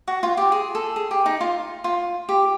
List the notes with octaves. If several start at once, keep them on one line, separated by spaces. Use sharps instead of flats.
F#4
F4
G4
G#4
A4
G#4
G4
D#4
F4
F4
G4